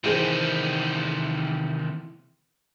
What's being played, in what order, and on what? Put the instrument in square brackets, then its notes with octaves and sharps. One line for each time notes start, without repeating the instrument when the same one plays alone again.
[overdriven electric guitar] C3 D#3 [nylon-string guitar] E3 G#4 C5